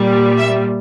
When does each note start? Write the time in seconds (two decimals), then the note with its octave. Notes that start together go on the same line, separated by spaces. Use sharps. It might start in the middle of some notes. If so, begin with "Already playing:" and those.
Already playing: A#2 G3
0.38 E5